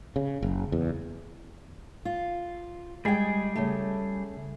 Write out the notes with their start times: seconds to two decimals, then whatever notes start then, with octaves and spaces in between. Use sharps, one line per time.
0.16 C#3
0.43 F#1
0.72 E2
2.05 F4
3.05 G3 G#3 G#4 G5
3.56 C#3 A3